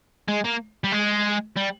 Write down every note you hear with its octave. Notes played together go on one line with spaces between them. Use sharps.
G#3
A#3
G3
G#3
G3